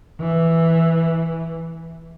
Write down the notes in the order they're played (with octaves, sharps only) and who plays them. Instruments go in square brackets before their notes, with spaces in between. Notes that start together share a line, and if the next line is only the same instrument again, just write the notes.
[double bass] E3